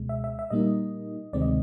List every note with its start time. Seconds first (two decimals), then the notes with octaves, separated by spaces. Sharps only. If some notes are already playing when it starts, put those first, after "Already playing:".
Already playing: C#2 B2 G#3
0.09 E5
0.24 E5
0.39 E5
0.50 A#2 G3 A#3 D#4 D#5
1.33 D2 C3 D#3 G#3 C4 D5
1.42 D#5